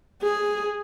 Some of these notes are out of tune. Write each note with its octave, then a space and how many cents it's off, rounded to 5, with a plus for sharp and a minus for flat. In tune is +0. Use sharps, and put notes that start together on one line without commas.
G#4 -5